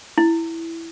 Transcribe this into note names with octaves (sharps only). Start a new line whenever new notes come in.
E4